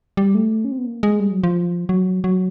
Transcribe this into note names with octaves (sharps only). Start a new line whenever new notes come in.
G3
A3
C#4
C4
B3
A#3
G#3
G3
F#3
F3
F#3
F#3